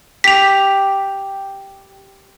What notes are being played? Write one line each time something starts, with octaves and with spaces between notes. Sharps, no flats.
G4 B6 F7